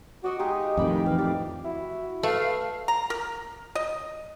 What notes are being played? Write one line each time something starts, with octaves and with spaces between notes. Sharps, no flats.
F#4 D5 D#5 C#6
G#3 D#4 G4 F5
F2 A2 D#3 D5 B5
E3 F5
G4 D5
E4 F#4
A3 B4 F5
A#5
A#4
D#5